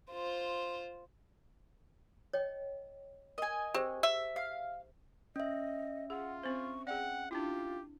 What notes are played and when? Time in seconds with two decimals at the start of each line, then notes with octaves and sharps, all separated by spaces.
0.11 F4 C5
2.33 C#5 D#5 G5
3.38 A#4 D#5 G#5
3.74 C4 G4 G#4 C5
4.03 E5
4.36 F5
5.36 C#4 D#5 E5
6.10 F4 G#4 F#5
6.43 C4 C5 C#6
6.87 G#4 D5 F#5 G5
7.31 D4 E4 F4 G4